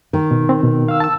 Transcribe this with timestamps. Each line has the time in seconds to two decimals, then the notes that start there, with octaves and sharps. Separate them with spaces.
0.13 D#3
0.31 B2
0.49 C4
0.64 B2
0.88 F5 E6
1.00 A5 E6